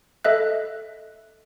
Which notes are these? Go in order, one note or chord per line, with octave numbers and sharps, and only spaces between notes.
A4 D#5 E5 F#6